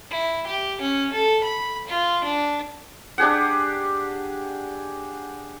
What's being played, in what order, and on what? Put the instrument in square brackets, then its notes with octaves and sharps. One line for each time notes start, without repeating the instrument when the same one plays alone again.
[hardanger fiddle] E4
G4
C#4
A4
B5
F4
D4
[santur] D4 G4 G#4 F#5